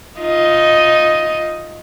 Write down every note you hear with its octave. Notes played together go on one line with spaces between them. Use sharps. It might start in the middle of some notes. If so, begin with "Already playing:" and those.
D#4 F4 D#5